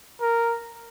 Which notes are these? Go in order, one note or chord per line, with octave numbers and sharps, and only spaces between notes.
A#4